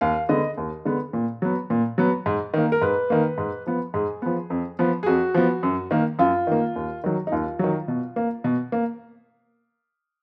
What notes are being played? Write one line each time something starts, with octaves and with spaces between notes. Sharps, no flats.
D#2 F5
D3 G#3 B3 D#5
D#2
D3 G#3 B3
A#2
F#3 B3
A#2
F#3 B3
G#2
D#3 A#3
A#4
G#2 B4
D#3 A#3
G#2
F3 B3
G#2 G#4
F3 B3
F2
F3 B3
G#4
F2 F#4
F3 B3
F#2
D#3 A#3
F#2 F4
D#3 A#3
D#2
D#3 F#3
D#4
D#2 F4
D#3 F#3
B2
A#3
B2
A#3